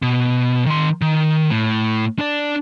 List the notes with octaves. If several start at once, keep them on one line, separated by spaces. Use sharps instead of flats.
B2
D#3 C6
D#3
A2
D4 D5